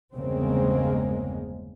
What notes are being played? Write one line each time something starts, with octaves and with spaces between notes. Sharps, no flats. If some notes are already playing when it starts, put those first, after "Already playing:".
G1 E2 C#3 G#3 A#3 C4